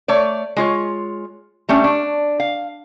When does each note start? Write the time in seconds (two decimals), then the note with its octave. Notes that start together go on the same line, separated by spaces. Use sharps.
0.08 A3 C#5 D5
0.57 G#3 F4 C#5
1.69 G3 A3 C#4 D4
1.84 D4
2.40 F5